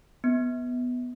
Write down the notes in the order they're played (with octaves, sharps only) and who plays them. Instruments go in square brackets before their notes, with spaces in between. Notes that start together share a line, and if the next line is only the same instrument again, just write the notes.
[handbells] B3